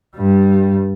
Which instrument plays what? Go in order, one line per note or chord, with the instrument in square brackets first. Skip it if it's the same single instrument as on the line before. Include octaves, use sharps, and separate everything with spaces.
[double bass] G2 G3